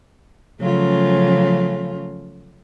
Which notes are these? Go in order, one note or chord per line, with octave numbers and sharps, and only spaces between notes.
C#3 F3 F#3 A3 C#4 F4